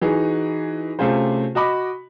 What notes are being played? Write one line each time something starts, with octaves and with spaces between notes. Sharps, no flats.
E3 D#4 F#4 G#4
C3 A3 C#4 F4 G#4 C5
F#4 D#5 B5 D6